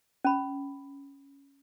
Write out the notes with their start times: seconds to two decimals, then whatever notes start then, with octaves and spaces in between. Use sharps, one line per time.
0.25 C#4 B5